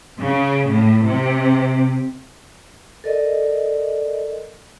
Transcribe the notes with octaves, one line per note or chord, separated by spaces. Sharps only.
C#3
A2
C3
A4 A#4 D5 D#5